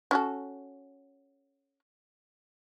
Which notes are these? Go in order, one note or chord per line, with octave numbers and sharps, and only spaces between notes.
C#4 F#4 A4